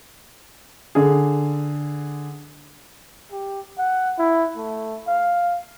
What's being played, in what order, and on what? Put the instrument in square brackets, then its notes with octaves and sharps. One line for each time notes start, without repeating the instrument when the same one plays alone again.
[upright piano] D3 G#4
[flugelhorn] G4
F#5
E4
A3
F5